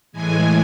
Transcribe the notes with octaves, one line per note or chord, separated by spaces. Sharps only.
A2 E3 G#3 G#5